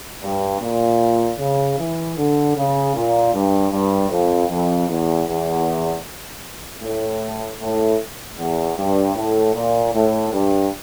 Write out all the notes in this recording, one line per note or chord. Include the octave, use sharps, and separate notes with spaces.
G2
A#2
C#3
E3
D3
C#3
A#2
G2
G2
F2
F2
E2
E2
A2
A2
E2
G2
A2
A#2
A2
G2